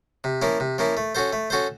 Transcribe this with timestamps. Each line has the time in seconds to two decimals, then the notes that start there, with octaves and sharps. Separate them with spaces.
0.24 C3
0.42 F3 A#3 C#4 E4
0.60 C3
0.78 F3 A#3 C#4 E4
0.97 A3
1.15 C#4 F#4 A4 C5
1.33 A3
1.50 C#4 F#4 A4 C5